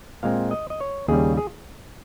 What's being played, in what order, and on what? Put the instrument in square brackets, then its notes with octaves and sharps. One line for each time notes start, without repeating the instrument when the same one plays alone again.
[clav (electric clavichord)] A#2 G#3 C4 F5
D#5
D#5
C#5
D#2 C#3 G3 G#4
G#4